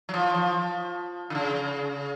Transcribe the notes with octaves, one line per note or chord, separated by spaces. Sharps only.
F#3
F3
F3
D3
C#3